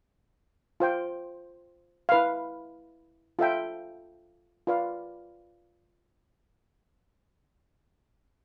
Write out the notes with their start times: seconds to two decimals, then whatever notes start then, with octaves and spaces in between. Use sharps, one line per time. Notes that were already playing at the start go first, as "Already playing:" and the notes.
0.80 F4 C5 G5
2.09 E4 B4 F5
3.39 F4 A4 E5 G5
4.67 F4 B4 D5 F5